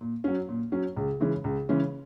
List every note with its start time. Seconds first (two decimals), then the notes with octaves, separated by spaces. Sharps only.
0.01 A#2
0.24 F#3 C#4
0.49 A#2
0.72 F#3 C#4
0.97 C#2
1.20 C#3 E3 G#3 C#4
1.44 C#2
1.69 C#3 E3 G#3 C#4